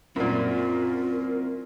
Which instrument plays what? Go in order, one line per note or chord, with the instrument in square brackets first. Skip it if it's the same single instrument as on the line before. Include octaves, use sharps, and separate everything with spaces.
[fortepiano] F#2 A#2 [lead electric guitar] C4 E4 [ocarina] F4 [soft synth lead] A#4